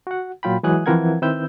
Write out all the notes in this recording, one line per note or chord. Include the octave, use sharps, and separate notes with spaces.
F#4 F#5
A#2 F#3 F4 G5 B5
E3 F#3 G#3 G#5 D#6 F#6
E3 F3 C4 A#4 F#5 G#6
D#3 C4 E4 B4 E6 G6